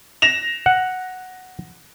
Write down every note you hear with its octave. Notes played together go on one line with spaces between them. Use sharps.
A#6 E7 F7
F#5